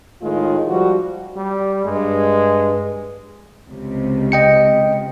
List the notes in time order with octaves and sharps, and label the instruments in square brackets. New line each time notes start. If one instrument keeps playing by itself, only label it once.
[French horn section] A2 D#3 G#3 F4
F3 G3 F#4
[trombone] G3
[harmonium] G2 [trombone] G#3
[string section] C#2 C3
[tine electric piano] D#5 G5 C#7